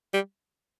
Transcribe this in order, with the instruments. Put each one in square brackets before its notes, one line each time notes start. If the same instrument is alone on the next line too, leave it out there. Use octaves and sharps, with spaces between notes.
[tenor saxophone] G3